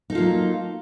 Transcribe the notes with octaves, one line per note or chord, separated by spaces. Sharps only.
F#3 A#3 D#4 F4 A4